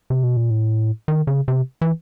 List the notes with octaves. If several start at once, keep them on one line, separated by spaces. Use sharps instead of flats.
C3
B2
A#2
A2
D#3
C#3
C3
E3